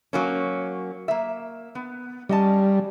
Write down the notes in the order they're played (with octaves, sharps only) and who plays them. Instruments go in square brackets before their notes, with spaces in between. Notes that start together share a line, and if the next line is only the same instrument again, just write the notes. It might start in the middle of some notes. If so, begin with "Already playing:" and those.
[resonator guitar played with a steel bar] F#3 A#3 C#4
A#3 E5
B3
[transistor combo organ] G3 [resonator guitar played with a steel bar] C#4 D#5 A5